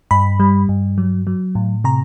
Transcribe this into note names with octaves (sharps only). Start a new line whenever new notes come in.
G2 B5
G3
G2
F#3
F#3
A2
C3 A#5